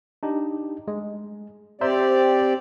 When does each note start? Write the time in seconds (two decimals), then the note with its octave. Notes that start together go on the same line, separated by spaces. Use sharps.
0.23 D4 D#4 G4
0.88 G#3
1.81 C4 G4 C5 D5 E5 A#5